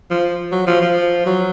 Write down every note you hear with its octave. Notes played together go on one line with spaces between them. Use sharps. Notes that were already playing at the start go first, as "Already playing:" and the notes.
F3
F#3
F3
F3
F#3